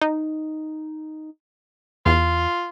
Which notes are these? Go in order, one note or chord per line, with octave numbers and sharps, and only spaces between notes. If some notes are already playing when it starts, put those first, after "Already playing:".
D#4
E2 F4